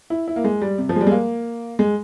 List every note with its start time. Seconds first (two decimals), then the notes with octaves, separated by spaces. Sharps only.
0.10 E4
0.28 E4
0.36 A#3
0.44 G#3
0.62 G3
0.78 C3
0.89 F3
0.96 G#3
1.01 G3
1.07 G#3
1.12 A#3
1.79 G#3